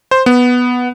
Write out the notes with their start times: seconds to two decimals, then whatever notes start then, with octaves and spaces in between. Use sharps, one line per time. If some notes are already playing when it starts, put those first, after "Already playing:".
0.11 C5
0.26 B3